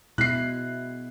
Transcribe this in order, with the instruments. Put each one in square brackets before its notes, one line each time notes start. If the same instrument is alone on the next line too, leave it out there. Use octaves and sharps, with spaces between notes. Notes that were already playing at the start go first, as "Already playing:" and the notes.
[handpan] B2 G#3 E4 [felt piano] F#6 C7